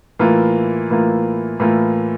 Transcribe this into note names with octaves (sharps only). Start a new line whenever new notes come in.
A2 E3 A#3 F4
A2 E3 A#3 F4
A2 E3 A#3 F4